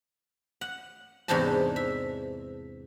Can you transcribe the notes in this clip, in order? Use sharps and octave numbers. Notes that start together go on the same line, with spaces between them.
F#5
E2 G#2 C3 D4 D#4 A5
E5